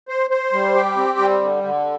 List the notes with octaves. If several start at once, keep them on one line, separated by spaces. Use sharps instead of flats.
C5
C5
G3
G4
C4
G3
D3
D3